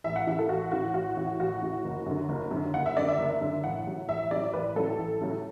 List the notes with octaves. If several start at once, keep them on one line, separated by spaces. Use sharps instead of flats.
A1 E5
F#5
A2 E3 E5
A4
A1 F#4
A2 E3 F#4
A1 F#4
A2 E3
A1 F#4
A2 E3
F#1
F#2 D3
F#1
F#2 D3
F#1 F#5
E5
F#2 D3 D5
E5
F#1
F#2 D3
A1 F#5
A2 F#3
A1 E5
A2 F#3 D5
A1 B4
A2 F#3 A4
A1
A2 F#3